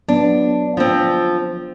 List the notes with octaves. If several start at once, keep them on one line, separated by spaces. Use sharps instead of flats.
F#3 B3 D4
F3 C4 D4